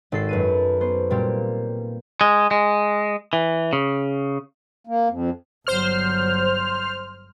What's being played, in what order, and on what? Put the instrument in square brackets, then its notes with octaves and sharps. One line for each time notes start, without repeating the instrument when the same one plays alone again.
[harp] G#1 A4 C7
F#2 B4 D#7
B3 C5
A#2 G3 A#3 C4 G4
[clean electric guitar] G#3
G#3
E3
C#3
[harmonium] A#3
F2
[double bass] G1 F#3 [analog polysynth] C5 F6